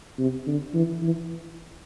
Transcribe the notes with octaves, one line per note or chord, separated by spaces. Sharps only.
C3
D3
E3
E3